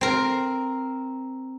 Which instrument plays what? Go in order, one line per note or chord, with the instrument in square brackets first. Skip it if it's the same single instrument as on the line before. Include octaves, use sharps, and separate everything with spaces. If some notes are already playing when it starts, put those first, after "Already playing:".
[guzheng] C4 A#4